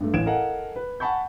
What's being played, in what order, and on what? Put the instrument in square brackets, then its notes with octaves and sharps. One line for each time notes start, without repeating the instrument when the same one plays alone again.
[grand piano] G2 A3
A1 E3 F5 G#6 D7 E7
A4 A#4 D#5 F5 F#5 G#5
B4
F#5 G#5 A5 B5 C#6 G6